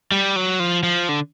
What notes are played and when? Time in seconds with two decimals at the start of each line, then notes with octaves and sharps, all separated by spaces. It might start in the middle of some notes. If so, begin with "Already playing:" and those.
0.12 G3
0.36 F#3
0.60 F3
0.83 F3
1.09 D3